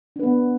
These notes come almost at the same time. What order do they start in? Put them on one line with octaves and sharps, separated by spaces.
D4 B4 B3